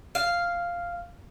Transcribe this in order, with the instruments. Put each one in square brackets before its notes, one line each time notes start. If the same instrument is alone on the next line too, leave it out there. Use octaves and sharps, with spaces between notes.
[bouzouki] F5